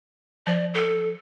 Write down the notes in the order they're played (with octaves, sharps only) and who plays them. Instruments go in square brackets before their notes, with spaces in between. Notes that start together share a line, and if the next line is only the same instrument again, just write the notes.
[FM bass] F3 [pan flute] D5
[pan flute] A4